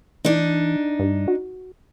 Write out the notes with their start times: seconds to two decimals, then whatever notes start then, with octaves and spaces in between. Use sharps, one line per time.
0.25 E3 D4 D#4
0.99 G2
1.28 F#4